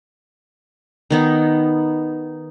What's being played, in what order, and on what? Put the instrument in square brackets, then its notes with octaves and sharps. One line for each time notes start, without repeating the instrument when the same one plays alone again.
[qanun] D#3 B3 D#4